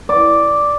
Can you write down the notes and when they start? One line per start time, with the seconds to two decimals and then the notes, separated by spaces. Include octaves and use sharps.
0.09 D5